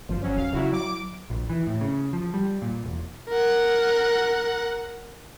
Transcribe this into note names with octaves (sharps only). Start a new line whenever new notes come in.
G1 F3
F#3 C#4
D#1 F5
C#3 F#3 E4 F#4
F#3 D6 D7
A#1
E3
A2
C#3
F3
G3
A#2
E1
A#4 F#5